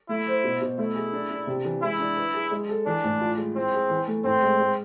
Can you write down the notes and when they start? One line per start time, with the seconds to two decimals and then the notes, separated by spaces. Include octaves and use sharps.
0.09 A3 E4
0.27 C5
0.44 B2
0.61 B2
0.78 A3 E4
0.95 G#4
1.13 D4
1.31 D4
1.47 C3
1.65 E3
1.82 G#3 E4
2.00 D4
2.17 B4
2.34 G#4
2.51 G#3
2.69 A4
2.86 E3 D4
3.04 A2
3.21 F4
3.38 G#3
3.55 C4 E4
3.74 G#4
3.90 E3
4.08 A3
4.24 A2 C4
4.42 G#3
4.60 G#3